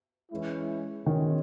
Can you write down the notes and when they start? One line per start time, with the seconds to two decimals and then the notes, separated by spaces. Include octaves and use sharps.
0.30 E3 G#3 C#4 E4
1.05 B2 D#3 G#3 C#4